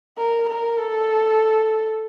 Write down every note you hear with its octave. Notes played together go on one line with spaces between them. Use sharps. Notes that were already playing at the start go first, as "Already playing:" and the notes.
A#4
A#4
A4